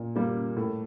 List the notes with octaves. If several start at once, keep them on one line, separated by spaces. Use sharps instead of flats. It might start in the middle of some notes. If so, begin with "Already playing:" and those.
Already playing: A#2
G3 A#3
A2